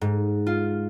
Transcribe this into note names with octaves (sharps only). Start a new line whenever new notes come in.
G#2
F4